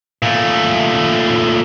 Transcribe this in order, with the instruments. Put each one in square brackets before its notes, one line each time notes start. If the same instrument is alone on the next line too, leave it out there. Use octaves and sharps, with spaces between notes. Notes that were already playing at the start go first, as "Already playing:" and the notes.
[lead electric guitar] A#2 A3